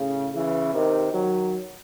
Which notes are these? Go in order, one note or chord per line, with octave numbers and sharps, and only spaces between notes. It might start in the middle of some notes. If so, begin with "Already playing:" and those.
Already playing: A2 C#3
C#3 E3
C3 D#3
D#3 F#3